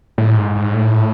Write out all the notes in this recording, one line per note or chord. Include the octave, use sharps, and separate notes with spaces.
A2
G#2
G#2
A2